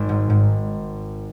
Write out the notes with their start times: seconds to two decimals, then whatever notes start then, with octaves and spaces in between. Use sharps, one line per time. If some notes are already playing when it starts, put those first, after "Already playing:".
Already playing: G#1
0.09 G#2
0.30 G#2